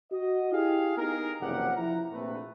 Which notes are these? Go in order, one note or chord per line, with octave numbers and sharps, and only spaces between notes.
F#4 D#5
E4 G4 G#4 F5
B3 D#4 G#4 A#4
F#1 C3 E3 F3 G4 F#5
F3 E4 A#5
A#1 C3 A3 B4